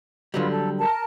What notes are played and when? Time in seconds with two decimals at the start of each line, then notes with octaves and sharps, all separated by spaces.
0.34 D3 F#3 G3 F4 B4
0.50 A4
0.78 A#4 A5